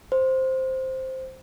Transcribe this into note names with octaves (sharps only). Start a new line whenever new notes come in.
C5